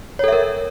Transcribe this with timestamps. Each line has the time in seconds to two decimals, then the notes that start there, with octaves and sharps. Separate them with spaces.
0.19 C#5
0.24 A4
0.28 E5
0.33 A#4